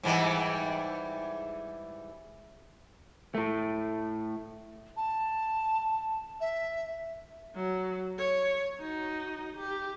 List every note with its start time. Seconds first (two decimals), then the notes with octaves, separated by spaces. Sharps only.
0.03 G#2 E3 G3
3.35 A2 A3
4.97 A5
6.40 E5
7.56 F#3
8.18 C#5
8.80 D#4 F#4
9.55 G4